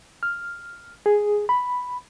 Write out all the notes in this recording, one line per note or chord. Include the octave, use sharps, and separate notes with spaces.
F6
G#4
B5